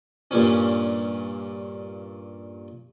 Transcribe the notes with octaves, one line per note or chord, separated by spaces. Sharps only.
G2 A#2 C#4